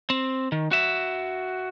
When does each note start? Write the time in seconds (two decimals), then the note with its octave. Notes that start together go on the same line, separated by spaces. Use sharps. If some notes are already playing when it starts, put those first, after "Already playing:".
0.10 C4
0.52 D#3
0.71 F#4 E5